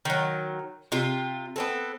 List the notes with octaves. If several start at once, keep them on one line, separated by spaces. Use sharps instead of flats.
D#3 F#3
C3 F4
B3 C4 A4